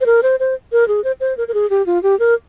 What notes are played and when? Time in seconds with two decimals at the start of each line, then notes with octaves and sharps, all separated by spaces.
0.01 C5
0.06 A#4
0.23 C5
0.40 C5
0.72 A#4
0.88 G#4
1.04 C5
1.20 C5
1.37 A#4
1.48 A#4
1.54 G#4
1.70 G4
1.86 F4
2.03 G4
2.20 A#4